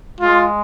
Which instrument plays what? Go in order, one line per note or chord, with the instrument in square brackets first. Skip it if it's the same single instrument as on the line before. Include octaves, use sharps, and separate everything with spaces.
[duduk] G#3 [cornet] F4